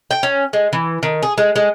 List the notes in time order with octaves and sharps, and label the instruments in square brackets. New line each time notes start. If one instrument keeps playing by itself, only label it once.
[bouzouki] G5
C#4
G#3
E3
D#3
G#4
G#3
G#3